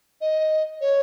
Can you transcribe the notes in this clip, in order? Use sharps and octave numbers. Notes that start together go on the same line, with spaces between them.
D#5
C#5